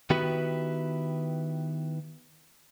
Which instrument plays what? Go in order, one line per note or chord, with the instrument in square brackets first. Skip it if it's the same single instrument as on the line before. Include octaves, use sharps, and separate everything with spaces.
[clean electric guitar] D#3 B3 E4 F#4 G4 B4